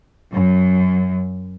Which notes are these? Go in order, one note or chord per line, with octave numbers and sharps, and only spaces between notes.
F#2